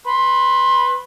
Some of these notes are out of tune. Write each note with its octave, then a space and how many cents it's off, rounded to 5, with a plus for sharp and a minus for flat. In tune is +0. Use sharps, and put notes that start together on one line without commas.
B4 +0 C6 +25